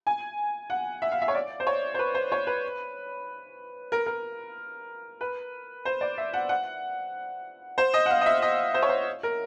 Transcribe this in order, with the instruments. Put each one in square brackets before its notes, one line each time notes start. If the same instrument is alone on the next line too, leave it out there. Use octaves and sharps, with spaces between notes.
[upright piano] G#5
F#5
E5
F5
E5
C#5
D5
C5
C#5
C5
B4
C5
C#5
B4
A#4
A#4
B4
C5
D5
E5
F#5
F#5
C5
D#5
F#5
F5
D#5
E5
D#5
C5
C#5
C5
A#4